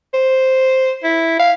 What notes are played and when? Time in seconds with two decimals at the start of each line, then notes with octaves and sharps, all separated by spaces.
0.14 C5
1.04 E4
1.39 F5